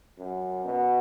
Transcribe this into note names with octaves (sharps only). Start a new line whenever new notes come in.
F#2
B2